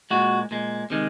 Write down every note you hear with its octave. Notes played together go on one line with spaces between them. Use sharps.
A#2 G#3 F#4
A#2 G#3
C3 D#3 G#3